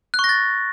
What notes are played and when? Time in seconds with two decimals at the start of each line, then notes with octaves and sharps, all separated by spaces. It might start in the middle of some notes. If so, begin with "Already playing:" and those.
0.14 F#6
0.19 C#6
0.24 A#6
0.29 A6